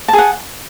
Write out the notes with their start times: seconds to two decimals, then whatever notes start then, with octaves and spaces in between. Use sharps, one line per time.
0.08 A5
0.13 G#4
0.18 F#5